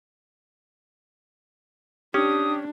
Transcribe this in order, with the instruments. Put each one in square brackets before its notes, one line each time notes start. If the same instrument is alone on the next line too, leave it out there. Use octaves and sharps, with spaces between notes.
[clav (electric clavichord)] C#4 [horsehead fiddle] D4 [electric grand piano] G4 [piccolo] D#6